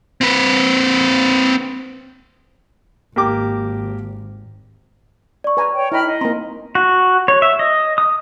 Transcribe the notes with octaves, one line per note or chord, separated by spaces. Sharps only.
C4 B4
G#1 A#3 G4 D6
D5 C#6
B4 G#5 A#5
C#5 G5
E4 D#5 G5 A#5 B5 F6
D#4 D#5
A#3 C4 A#5 C6
F#4
C#5
E5
D#5
D#6